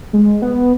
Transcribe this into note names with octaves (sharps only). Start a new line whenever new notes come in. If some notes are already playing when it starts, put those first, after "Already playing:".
G#3
B3